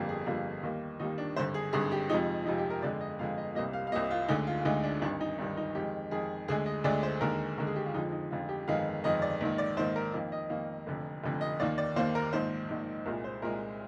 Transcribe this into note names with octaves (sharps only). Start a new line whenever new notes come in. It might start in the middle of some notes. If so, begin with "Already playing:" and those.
Already playing: G1 F2 D3 G3 A#3
G#4
G1 F2 D3 G3 A#3 F4
D#2 D#3 G3 A#3
D#2 D#3 G3 A#3 D#4
D4
G#1 G2 D3 C5
G#4
G#1 G2 D3 G#4
G4
F2 C3 F3 G#3 D#4
F2 C3 F3 G#3 D#4
G4
A#4
G1 F2 D3 G#3 D5
D#5
G1 F2 D3 G#3 F5
D#5
C2 C3 G3 A#3 D#5
F5
F5
C2 C3 G3 A#3 D#5
F4
D2 D3 G#3 D#4
F4
F4
D2 D3 G#3 D#4
D4
G#1 G2 D#3 D4
D#4
G#1 G2 D#3 D4
D#4
F2 D#3 G#3 G4
F2 D#3 G#3 G#4
D2 D3 G#3 G#4
D#5
D2 D3 G#3 D5
C5
D#2 D3 G#3 A#4
D#2 D3 G#3 A#4
G#4
G4
F4
F2 D3 F3 G#3 D#4
D#4
F2 D3 F3 G#3 F4
G4
G1 F2 D#3 G#3 F5
G1 F2 D#3 G#3 D#5
D5
A#1 G#2 D#3
D5
A#1 G#2 D#3 C5
A#4
F2 D#3 A#3
D#5
F2 D#3 A#3
F1 F2 D3
F1 F2 D3
D#5
D#2 D#3 A#3 D5
D5
D#2 D#3 A#3 C5
A#4
A#1 G#2 D#3 C5
A#1 G#2 D#3
C2 A#2 G#3 A#4
C5
C2 A#2 G#3 A#4